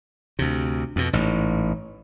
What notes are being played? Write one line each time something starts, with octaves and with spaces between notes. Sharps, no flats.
D2 C3
F2 B2
A1 G#2